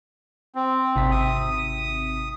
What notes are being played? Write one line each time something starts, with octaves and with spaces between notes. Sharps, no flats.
C4
G#1 C3 B6
D#6